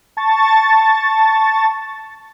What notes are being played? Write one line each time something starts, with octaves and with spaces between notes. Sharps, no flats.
A5 C#6 A6